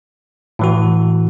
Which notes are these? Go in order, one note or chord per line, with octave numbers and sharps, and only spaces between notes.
A2 E3 F#4